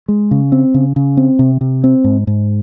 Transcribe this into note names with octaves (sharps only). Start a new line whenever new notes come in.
G#3
C#3
C4
C#3
C#3
C4
C3
C3
C4
G#2
G#2